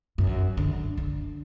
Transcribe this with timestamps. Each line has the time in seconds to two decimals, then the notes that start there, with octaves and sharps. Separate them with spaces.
0.18 F#2
0.57 D3
0.97 D3